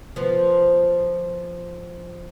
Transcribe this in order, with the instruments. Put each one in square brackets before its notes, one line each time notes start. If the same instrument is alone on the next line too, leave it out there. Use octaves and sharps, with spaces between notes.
[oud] F3 B3